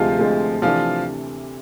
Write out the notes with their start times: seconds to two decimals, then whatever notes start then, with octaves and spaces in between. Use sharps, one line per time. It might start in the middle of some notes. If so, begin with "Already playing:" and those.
Already playing: D2 C3 F3 G#3 F4
0.19 D2 C3 G#3
0.62 C3 E3 F3 A3 D4 F4